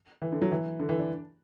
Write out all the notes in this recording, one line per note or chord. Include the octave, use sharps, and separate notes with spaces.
E3
D3
F#3
E3
D3
E3
D4